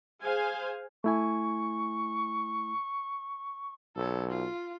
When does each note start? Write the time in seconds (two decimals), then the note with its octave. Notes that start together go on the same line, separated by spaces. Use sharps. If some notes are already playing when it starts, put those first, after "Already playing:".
0.21 G#4 C5 F5 G#5
1.04 A3 E4 G#5 C#6
3.96 B1 A4 C#5
4.30 F4